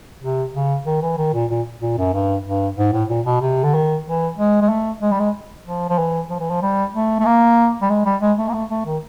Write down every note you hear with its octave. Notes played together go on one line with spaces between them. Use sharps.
C3
C#3
D#3
E3
D#3
A#2
A#2
A#2
F#2
G2
G2
G#2
A2
A#2
B2
C3
D3
D#3
E3
G#3
G#3
A3
G#3
G3
G#3
F3
F3
E3
F3
E3
F3
G3
A3
A3
A#3
G3
G#3
G3
G#3
A3
A#3
A3
A3
D#3